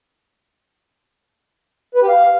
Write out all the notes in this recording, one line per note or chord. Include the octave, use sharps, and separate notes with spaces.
B4
G4
F5